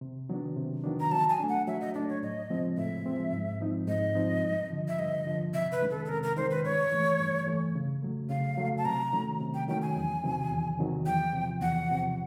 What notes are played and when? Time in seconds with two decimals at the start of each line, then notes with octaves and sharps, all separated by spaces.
0.01 C3
0.29 D#3 F#3 B3 D4
0.57 C3
0.84 D#3 F#3 B3 D4
1.00 A#5
1.11 F#3 A5
1.30 G#5
1.39 A3 D4
1.49 F#5
1.67 F#3 E5
1.81 D#5
1.94 A3 D4 D5
2.09 C#5
2.22 A2 D#5
2.50 F3 G#3 C4
2.77 A2 E5
3.06 F3 G#3 C4
3.32 G#2
3.60 F3 G#3 C4 D#4
3.88 G#2 D#5
4.15 F3 G#3 C4 D#4
4.44 G2
4.71 D3 F3
4.88 E5
4.99 G2 D#5
5.26 D3 F3
5.53 C3 E5
5.72 B4
5.81 D#3 G#3 C#4
5.90 A4
6.05 A4
6.09 C3 A#4
6.23 A#4
6.36 D#3 G#3 C#4 C5
6.51 B4
6.64 G2 C#5
6.91 E3 A3
7.19 G2
7.47 E3 A3
7.75 C#3
8.02 F#3 A3
8.29 C#3 F5
8.57 F#3 A3
8.78 A5
8.85 C3 A#5
9.12 D#3 F#3 A3 C#4
9.40 C3
9.54 G5
9.68 D#3 F#3 A3 C#4 G5
9.82 G#5
9.96 E2
10.23 C3 D#3 F#3
10.51 E2
10.79 C3 D#3 F#3
11.06 E2 G5
11.33 C3 F3
11.61 E2 F#5
11.89 C3 F3